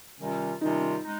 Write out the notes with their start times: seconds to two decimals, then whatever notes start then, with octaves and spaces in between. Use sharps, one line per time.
0.19 C3 D#3 G3 C#4 F4
0.61 C3 D#3 G3 C#4 D#4 F4
1.03 G#3 D#4